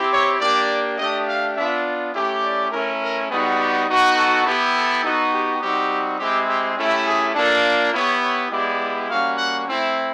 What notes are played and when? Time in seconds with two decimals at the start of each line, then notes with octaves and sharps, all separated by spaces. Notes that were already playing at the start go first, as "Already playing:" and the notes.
Already playing: C4 E4 G4
0.12 C#5
0.40 A#3 D4 G4 D5
0.98 A3 D4 G4 D#5
1.27 F5
1.56 B3 D4 F4 E5
2.14 A3 C#4 E4 G4
2.43 D5
2.72 A3 C#4 E4 A#4
3.01 A#4
3.29 G3 B3 D#4 F#4 G#4
3.58 G4
3.88 B3 D#4 F#4
4.17 A4
4.45 B3 E4 G4
4.75 A4
5.04 B3 D#4 F#4
5.32 G4
5.62 G3 C4 D#4 F#4 G4
6.19 G#3 C4 E4 G4
6.48 G4
6.77 A3 C#4 E4 G4
7.07 G#4
7.35 A#3 D4 F4 A4
7.93 B3 E4 G4 C#5
8.22 C#5
8.50 G#3 B3 E4 G4 D5
9.09 G3 A#3 C#4 F#4 F5
9.38 F#5
9.67 A3 C4 E4